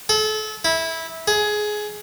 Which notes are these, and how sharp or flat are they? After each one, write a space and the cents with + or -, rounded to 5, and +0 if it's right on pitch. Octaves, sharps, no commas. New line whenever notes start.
A4 -35
E4 -15
G#4 +15